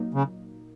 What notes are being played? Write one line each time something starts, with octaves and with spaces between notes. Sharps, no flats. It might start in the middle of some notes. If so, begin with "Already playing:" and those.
Already playing: A#2 F#3 A#3 D#4
C#3